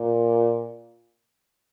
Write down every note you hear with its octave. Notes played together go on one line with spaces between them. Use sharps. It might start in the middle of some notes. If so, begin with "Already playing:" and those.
Already playing: A#2